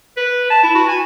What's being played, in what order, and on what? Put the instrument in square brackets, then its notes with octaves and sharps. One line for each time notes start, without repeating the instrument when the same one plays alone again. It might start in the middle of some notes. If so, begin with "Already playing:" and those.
[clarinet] B4
A5
E4
F#4
G#5